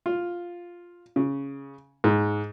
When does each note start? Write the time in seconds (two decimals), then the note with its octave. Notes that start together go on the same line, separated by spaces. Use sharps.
0.06 F4
1.16 C#3
2.04 G#2